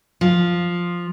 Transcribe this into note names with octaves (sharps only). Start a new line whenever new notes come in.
F3